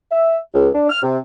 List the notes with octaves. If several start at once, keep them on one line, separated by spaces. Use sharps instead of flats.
E5
C#2
D4
F6
C3